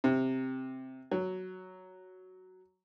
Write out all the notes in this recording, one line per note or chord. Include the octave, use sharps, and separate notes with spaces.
C3
F#3